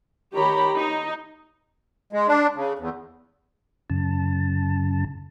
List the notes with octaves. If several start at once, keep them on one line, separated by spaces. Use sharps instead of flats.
D#3 G4 C#5 A#5 B5
D#4
G#3
D4
C#3
E2
F#2 C#3 A5